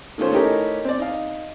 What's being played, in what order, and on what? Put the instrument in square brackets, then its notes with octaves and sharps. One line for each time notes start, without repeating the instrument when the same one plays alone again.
[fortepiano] D#3 A3 C#4 F4 C5
A3 C#4 D#4 E4 G4 A#4
C4 D5
D#4 F5